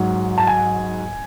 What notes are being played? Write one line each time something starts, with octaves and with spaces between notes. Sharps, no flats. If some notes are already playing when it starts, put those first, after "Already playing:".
Already playing: G#2 F#3
A5
G#5